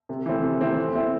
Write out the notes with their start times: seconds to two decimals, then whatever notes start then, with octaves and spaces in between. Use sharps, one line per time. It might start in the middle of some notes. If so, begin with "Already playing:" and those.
0.09 C3
0.26 E3 A3 C4
0.44 C3
0.61 E3 A3 C4
0.78 A3
0.95 C4 E4